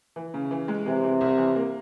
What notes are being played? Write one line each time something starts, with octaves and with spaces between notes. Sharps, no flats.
E3
C#3
E3
G#3
C3 E3
E3
C2
E3
A#3